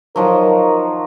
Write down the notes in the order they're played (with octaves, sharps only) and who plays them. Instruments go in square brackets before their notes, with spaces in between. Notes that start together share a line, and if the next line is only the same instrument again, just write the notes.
[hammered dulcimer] D#3 F3 F#3 [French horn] A#4